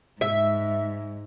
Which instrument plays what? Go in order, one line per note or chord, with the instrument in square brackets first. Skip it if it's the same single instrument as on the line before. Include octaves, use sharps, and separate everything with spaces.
[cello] G#2 [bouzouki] E5